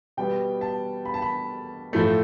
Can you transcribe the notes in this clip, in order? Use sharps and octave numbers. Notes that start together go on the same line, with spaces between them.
B2 G3 B3 G5
A5
B5
A5
B5
A2 F3 A3